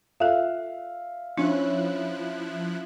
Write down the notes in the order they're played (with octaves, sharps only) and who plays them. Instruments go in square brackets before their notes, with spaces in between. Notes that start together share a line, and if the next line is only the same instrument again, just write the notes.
[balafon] F4 A4 [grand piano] E5 F5
[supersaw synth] F3 E4 F#6 [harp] C#4 [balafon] D4